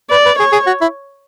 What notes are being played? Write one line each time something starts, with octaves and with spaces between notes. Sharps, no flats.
B4 D5
B4
G#4 C#5
G#4
F#4
E4